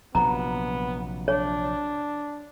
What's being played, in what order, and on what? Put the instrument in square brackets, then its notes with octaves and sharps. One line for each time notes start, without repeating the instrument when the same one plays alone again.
[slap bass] A#1 C3 F#3 [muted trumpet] B3 [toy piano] A#5
[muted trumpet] D4 [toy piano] C#5